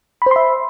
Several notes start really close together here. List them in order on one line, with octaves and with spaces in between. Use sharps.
B5 C5 C6 E5